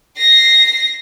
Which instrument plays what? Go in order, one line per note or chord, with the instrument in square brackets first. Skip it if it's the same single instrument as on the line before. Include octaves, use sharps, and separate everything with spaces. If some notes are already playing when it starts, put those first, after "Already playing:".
[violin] A#6 C7